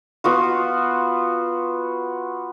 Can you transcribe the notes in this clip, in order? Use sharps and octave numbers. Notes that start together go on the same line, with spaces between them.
B3 F4 F#4